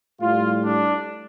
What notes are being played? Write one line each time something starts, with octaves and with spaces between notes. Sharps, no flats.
A2 G3 F4
D4